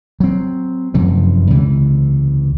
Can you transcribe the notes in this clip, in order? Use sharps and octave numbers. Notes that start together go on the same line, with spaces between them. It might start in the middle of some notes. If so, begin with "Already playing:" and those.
F#3 C4
F1 F#2 C3 E3
C#2 C3 E3